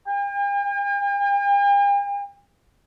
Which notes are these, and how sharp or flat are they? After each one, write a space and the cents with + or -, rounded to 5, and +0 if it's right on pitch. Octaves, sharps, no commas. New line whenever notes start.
G5 +45